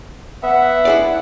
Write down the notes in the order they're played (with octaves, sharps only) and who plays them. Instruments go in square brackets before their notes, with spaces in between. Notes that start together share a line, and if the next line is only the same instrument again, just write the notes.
[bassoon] B3 [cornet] E5 [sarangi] F#5
[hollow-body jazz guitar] E4 G#4 D5